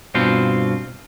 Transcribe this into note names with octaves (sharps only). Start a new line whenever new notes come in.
G2 B2 C4 F4